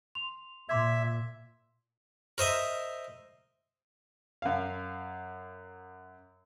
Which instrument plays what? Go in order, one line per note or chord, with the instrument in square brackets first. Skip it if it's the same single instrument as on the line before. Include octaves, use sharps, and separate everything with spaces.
[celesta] C6 F7
[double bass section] A#2 [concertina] E5 [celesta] C6 D6 G#6
[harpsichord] A#4 C5 D#5 E5
[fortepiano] F#2 F5